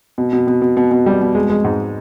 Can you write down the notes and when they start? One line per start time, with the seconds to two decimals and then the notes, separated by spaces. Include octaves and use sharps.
0.18 B2
0.33 B2
0.47 B2
0.62 B2
0.77 B2
0.91 B2
1.06 G3
1.21 B2
1.35 G#3
1.50 G#3
1.64 G#2